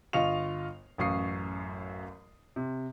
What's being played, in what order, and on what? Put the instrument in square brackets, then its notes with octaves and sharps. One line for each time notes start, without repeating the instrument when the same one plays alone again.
[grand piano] G1 F4 D#5 F5 C#6 F7
A1 F#2 F5 C#6 D#6 C7
C3